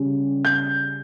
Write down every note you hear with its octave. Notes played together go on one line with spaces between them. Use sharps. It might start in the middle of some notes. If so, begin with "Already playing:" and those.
Already playing: C#3 G3 C#4
G6